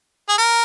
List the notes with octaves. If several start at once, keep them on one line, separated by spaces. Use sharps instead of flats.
G#4
A#4